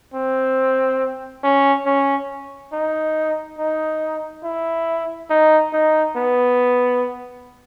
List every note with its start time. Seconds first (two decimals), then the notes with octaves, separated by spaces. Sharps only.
0.14 C4
1.44 C#4
1.86 C#4
2.73 D#4
3.59 D#4
4.44 E4
5.30 D#4
5.73 D#4
6.16 B3